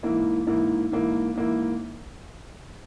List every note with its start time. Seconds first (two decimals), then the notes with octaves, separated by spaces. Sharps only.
0.03 G#2 E3 A#3 E4
0.47 G#2 E3 A#3 E4
0.92 G#2 E3 A#3 E4
1.35 G#2 E3 A#3 E4